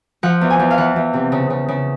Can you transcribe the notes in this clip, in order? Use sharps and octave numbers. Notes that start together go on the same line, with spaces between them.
F3 F#5
E2
G#5
E2
F5
E3 F#5
E2
C3
C#3
C#3
C#3